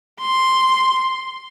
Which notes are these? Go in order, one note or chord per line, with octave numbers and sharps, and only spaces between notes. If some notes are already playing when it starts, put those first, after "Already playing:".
C6